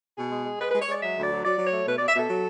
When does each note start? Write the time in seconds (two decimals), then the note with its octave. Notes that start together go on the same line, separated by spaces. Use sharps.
0.18 B2 G#4
0.32 G#3
0.46 G#3
0.60 G#3 B4
0.71 G#3 B4
0.82 C#5
0.89 G#3 D5
1.02 F#3 E5
1.17 D2
1.23 D5
1.30 F#3
1.44 F#3 D5
1.58 F#3
1.65 C#5
1.73 A3
1.86 B2 B4
1.98 B2 D5
2.08 E5
2.15 B2 A4
2.29 F#3